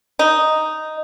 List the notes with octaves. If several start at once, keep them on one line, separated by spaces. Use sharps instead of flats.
D#4